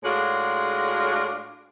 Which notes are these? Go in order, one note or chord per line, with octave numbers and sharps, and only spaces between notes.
A2 G#3 D4 F4 F#4 G#4